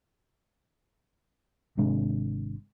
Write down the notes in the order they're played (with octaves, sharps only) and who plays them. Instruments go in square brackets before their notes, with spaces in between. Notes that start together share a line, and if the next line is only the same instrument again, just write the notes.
[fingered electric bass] G#1 C3 G#3 D4